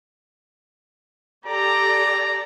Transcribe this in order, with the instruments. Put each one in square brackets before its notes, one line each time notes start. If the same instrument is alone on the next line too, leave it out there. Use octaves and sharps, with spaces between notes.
[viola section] G4 A4 D5 [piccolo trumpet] A#5